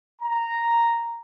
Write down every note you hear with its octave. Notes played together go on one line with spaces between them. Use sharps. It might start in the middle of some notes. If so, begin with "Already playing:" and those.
A#5